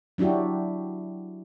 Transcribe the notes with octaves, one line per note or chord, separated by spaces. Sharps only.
F#3 D4 E4 F#4 G4